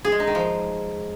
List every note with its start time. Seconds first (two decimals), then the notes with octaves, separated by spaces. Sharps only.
0.05 G#4
0.12 G#3
0.20 D#4
0.27 D#3
0.35 F3